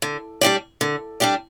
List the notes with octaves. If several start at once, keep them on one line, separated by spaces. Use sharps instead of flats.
D3
G3 D4 G4 D5
D3
G3 D4 G4 D5